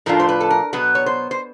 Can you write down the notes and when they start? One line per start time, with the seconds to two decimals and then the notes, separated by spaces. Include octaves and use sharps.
0.06 A2 F3 A3 D4 F4 A#4
0.20 C5
0.29 B4
0.40 A4
0.50 A#4
0.73 B2 F#3 B3 B4
0.95 C#5
1.06 C5
1.31 C5